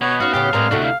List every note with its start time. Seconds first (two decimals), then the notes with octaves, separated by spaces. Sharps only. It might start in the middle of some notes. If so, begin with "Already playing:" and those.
0.01 B2 B3 C#5
0.20 C#4 D#4 F#4 F5
0.34 A2 C#3 C#4 G4 F5
0.53 A2 G#3 C4 A#4 B4 D5
0.71 D2 C3 D4 E4 F#4 A4
0.84 F5